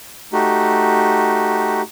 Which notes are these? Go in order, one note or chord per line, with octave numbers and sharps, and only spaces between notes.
A3 D#4 F#4 G4